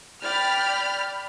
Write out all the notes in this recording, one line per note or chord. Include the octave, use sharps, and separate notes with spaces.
D5 G5 B5 F6